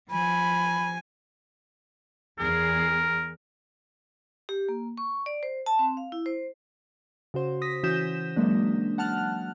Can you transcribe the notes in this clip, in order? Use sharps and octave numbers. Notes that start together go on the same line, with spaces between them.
F3 G#5 B5
E2 G#4 A#4
G4
A#3
C#6
D5
C5
A5
C4
F5
E4
C5
C#3 F#4 C5
D#6 A#6 B6
E3 C#4 F#4 D#6 G6 E7
F#3 G#3 A#3 D4
F#5 A5 F6 F#6